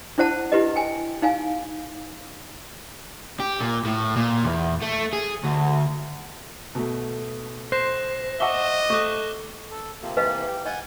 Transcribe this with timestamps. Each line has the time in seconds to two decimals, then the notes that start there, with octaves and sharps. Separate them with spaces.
0.18 D4 E4 C5 F#5 A5
0.52 E4 G4 B4 D#5
0.76 G5 G#5
1.22 D#4 F5 G#5
3.40 G4
3.60 A#2
3.85 A2
4.17 A#2
4.44 E2
4.82 A3
5.13 G#4
5.44 D2
6.75 B2 A3
7.72 C5 F#6 A#6 E7
8.40 D#5 E5 F#5 C#6 D6 G7
8.90 A3 C#6 D6 F#6
9.71 A4
10.02 C3 F3 A#3
10.17 C3 E3 A#3 B4 D#5 F5
10.47 G4
10.66 D#5 F#5 G#5 G6